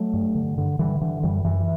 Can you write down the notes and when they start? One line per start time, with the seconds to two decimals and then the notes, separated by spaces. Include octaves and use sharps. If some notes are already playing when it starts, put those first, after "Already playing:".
Already playing: F#3 A3
0.13 G2
0.35 D3
0.58 D3
0.79 D3 E3 G3
1.01 D3 E3
1.23 F#2 E3 G3
1.44 F#2 E3